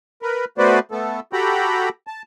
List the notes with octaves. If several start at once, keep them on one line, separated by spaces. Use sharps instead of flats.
A#4 B4
A3 B3 F#4 B4 C5 D5
A3 B3 A4
F#4 G4 A4 G5 A#5 B5
A5